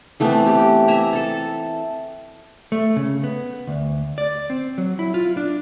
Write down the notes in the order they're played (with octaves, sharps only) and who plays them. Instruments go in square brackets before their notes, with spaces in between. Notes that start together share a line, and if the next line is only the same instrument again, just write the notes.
[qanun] E3 A3 B3 C4
G4
E5 G#5 A#5
A4 A5
[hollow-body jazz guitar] A3
C#3
B3
D2
D5
C4
F#3
E4
F4
D4